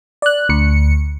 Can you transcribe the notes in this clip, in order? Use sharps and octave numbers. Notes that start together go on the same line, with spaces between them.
D5 F#6
D2 C#7